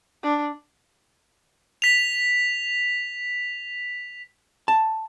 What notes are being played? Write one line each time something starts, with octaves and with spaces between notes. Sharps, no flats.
D4
B6 F7
A5